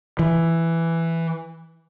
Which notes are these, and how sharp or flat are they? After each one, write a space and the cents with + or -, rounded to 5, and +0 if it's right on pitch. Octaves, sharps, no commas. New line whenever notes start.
E3 +5